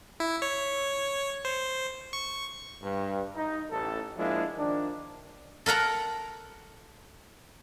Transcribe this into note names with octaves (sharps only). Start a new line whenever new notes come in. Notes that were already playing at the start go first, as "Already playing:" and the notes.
E4
C#5
C5
C#6
G2
D#4
A1 A4
F3 G#3 A#3 D4 E4
D#3 F3 D4
A4 A#4 F#5 A#5